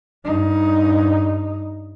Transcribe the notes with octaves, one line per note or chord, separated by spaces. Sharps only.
G2 D#4